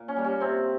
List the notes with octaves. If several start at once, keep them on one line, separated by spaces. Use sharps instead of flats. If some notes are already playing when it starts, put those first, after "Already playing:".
Already playing: A#2
C#4
G3 A#3
C#4
C3 C4